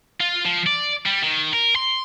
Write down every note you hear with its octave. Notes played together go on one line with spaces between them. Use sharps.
F4
F3
D5
G3
D#3
A#4
C6